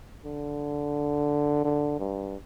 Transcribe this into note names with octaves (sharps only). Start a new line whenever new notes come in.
D3
D3
G2